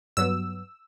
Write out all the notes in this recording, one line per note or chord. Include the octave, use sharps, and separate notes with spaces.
G2 F#3 B3 E6